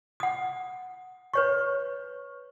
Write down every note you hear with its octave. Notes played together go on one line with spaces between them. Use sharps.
F#5 D#6
B4 C#5 C#6